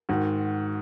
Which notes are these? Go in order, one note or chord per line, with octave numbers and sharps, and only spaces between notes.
G#2 D#3 F#4